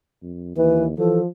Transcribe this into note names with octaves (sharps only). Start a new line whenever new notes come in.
F2
D#2 E3 B4
E3 F3 A4